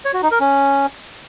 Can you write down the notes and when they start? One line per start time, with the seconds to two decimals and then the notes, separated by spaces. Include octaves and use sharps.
0.05 C#5
0.14 F#4
0.23 D#4
0.31 A#4
0.40 C#4